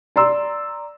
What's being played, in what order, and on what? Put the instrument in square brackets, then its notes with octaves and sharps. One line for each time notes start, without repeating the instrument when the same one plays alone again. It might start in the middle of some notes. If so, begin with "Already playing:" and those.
[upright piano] D5 A#5 C6 E6